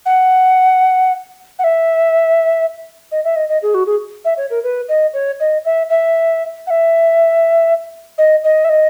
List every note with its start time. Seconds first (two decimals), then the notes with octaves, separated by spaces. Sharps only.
0.06 F#5
1.59 F#5
1.64 E5
3.12 D#5
3.24 E5
3.36 D#5
3.49 D#5
3.62 G#4
3.74 F#4
3.87 G#4
4.25 E5
4.37 C#5
4.50 A#4
4.63 B4
4.89 D#5
5.14 C#5
5.40 D#5
5.65 E5
5.90 E5
6.67 F#5
6.70 E5
8.18 D#5
8.44 D#5
8.64 E5
8.69 D#5